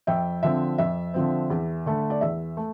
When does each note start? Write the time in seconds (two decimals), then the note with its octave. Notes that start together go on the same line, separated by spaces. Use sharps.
0.07 F2 E5 G5
0.43 D3 F3 C4 E5
0.78 F2 E5
1.14 D3 F3 C4
1.50 E2
1.86 D3 A3
2.10 D5
2.21 E2 E5
2.57 A3